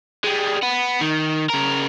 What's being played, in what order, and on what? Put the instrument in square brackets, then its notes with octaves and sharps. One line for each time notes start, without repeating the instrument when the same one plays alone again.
[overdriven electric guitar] G3 G#3
B3
D#3
C#3 A#4